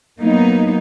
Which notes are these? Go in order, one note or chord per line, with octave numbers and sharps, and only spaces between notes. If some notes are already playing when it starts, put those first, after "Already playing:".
F#3 A#3 B3 D#4